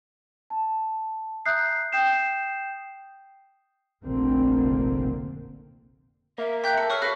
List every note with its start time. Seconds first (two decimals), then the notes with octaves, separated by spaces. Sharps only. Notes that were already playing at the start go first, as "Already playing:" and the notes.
0.50 A5
1.45 E5 A#5 D#6 F#6 G6 C7
1.92 G5 D#6 G6 C7 E7
4.04 F1 A#1 D3 A#3 C4
6.38 A#3 E5
6.64 G5 F#6 G6 B6
6.78 A4 C#7
6.90 A4 B4 C#5 C#6 F6 C7
7.02 F#4 A4 B4 E5